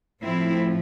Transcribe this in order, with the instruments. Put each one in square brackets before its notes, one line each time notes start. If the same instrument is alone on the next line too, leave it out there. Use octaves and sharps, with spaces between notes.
[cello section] A2 F3 A3 C4 E4